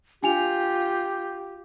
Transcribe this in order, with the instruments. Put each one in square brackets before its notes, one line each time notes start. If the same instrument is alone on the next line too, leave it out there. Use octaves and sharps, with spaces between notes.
[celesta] D4 G#5 F7 [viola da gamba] F4 [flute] G4